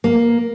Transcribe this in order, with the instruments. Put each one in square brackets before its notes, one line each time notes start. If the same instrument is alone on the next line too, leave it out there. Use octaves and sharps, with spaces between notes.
[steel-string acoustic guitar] A#3